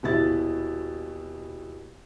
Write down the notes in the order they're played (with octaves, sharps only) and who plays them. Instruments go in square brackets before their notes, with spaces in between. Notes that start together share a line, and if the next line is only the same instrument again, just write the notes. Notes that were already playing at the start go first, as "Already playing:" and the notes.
[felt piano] D#1 B2 E4 A6